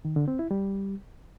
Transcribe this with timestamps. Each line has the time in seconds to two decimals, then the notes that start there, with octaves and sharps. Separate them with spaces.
0.05 D#3
0.16 D3
0.28 C4
0.39 E4
0.51 G3